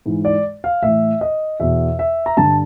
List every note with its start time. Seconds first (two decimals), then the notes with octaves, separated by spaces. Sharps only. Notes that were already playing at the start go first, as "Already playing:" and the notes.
0.06 G#2 E3
0.25 D5
0.64 F5
0.83 A2 E3 E5
1.21 D#5
1.60 E2 B2 E5
1.99 E5
2.26 A#5
2.37 G2 D3 A5